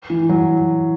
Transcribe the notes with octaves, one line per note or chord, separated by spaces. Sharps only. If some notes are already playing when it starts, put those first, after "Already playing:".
E3
F#3